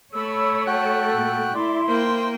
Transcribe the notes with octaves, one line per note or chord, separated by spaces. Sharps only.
A3 C#5 B5 E6
F#4 A4 G5 F#6
A#2
E4 D5 C6
A#3 C5 G5